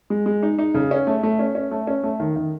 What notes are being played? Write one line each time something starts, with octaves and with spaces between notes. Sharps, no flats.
G#3
G#3
D#4
D#4
C#3
C#4
A3
A3
C#4
C#4
A3
C#4
A3
D#3
D#3